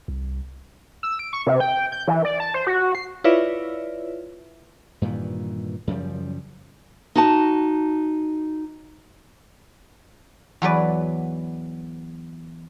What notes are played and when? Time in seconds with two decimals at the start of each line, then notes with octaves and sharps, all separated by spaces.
0.08 C2
1.03 E6
1.19 D7
1.33 C#6
1.47 C3
1.60 G5
1.92 G6
2.08 E3
2.25 D5
2.40 A5
2.54 C5
2.67 F#4
2.95 C7
3.24 E4 F4 B4 C#5 D5 E5
5.02 G2 A#2 D#3 E3
5.87 F#2 C#3 F3 G3
7.15 D#4 F#4 A5
10.62 E2 F#3 B4 D5